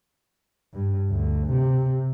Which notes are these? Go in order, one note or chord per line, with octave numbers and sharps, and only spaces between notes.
G2
D2
C3